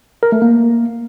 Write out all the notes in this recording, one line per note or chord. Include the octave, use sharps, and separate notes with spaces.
A#4
A3
A#3